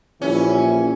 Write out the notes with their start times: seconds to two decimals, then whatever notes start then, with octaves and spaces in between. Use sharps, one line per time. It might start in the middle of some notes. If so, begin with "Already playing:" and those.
0.22 A#1 E3 G3 C#4 E4